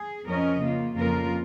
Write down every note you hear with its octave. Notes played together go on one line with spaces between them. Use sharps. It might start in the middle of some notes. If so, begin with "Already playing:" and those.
Already playing: G#4
F2 F3 C#4 A#4 D#5
C#3 A#3 F4
F2 C#3 A#3 F4 A#4